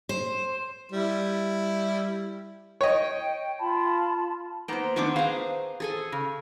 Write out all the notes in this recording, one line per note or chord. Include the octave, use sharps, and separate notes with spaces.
C5
G3 E4
C#5 D#5 G5
F4 A5 B5
A#3 B3 D#4 C5 G5
D#3 A3 B3 C4 D4 D6
G#4 B4 C5 F5 A#5
G#4 A4 G#5
C#3